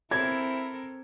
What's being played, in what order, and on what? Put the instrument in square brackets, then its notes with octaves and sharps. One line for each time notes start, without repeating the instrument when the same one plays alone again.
[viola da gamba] C4 A4 A#4 [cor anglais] E4 [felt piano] G#6